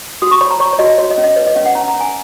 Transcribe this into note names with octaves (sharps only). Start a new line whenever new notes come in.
F#4 D#6
C#6
C#5 B5
A#5
C#5 C#6
C#5
F#4 D#5
F#4 C#5
D#5
C#4
D#5
B4 C#5
D#5
C#4 F5
F#5
C#4 A#5
A#5
C#4
G#5